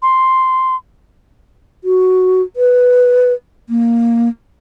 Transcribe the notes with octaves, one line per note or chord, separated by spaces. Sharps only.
C6
F#4
B4
A#3